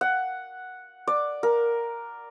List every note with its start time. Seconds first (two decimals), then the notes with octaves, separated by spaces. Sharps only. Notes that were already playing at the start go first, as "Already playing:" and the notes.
0.01 F#5
1.07 D5
1.43 A#4